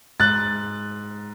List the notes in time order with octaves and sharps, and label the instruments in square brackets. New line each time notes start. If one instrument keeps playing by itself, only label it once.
[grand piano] G#2 F#6 A6